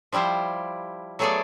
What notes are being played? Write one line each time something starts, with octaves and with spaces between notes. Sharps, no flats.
F3 G3 E4 G4 C5
F#3 A3 B3 G#4 A4 D5